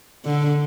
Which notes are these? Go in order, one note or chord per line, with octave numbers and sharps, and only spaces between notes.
D3